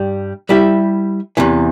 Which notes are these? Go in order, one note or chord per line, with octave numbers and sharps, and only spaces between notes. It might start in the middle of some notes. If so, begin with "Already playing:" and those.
Already playing: G2 G3
G3 E4 G4 E5
E2 C3 E3